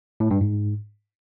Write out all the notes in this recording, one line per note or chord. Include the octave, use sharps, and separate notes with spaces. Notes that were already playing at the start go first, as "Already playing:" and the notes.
A2
G2
G#2